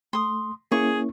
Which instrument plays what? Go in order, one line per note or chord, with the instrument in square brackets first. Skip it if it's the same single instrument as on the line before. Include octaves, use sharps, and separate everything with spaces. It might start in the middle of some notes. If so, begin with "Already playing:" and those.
[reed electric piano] A3 [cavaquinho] C6 D#6
[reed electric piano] A#3 C#4 E4 [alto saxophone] G#4 [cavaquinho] C#6